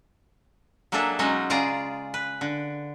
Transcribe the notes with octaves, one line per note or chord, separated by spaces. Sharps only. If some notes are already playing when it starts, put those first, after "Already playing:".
F#3 A#3 D4 G#4 A4 E5
B2 F#3 G#3 C#4 D#4 D#5
C#3 F4 G#4 D5 A#5
B4
D3